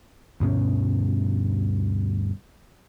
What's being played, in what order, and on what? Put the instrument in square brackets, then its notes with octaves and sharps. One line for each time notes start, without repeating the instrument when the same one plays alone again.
[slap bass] D2 G2 B2 C#4